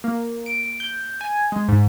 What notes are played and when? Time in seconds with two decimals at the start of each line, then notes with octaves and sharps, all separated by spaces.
0.04 A#3
0.46 D7
0.80 G6
1.21 G#5
1.52 G#3
1.68 G#2